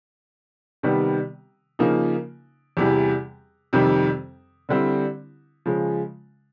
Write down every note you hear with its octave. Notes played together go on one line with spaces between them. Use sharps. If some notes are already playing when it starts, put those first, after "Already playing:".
C3 D#3 G3 B3
C#3 F3 A#3 D#4
E2 C3 E3 G3
F2 C3 D#3 G3 C4
D3 G3 C4 E4
C#3 F3 G#3